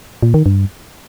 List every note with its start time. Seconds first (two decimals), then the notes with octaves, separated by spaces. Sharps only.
0.23 A#2
0.34 D#3
0.46 G2